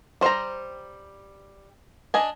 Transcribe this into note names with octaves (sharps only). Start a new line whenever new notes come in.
G3 C5 F5 G5 A#5
D4 D#5 G#5